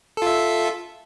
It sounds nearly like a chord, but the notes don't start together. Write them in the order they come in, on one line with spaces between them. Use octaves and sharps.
A4 F4 E5